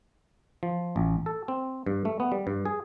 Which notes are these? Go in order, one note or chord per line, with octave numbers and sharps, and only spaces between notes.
F3
A1
A4
C4
G2
A3
B3
G3
G2
G#4